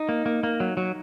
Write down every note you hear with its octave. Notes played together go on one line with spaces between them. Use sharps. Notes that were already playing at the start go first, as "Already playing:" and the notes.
Already playing: D#4
A#3
A#3
A#3
F#3
F#3